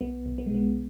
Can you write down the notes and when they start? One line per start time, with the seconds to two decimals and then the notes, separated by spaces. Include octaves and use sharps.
0.01 B1 B3
0.26 B1
0.38 B3
0.46 G#3
0.50 B2 B3